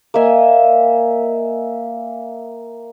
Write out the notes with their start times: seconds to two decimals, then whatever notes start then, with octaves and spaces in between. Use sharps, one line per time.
0.14 A#3 D#5 E5 G#5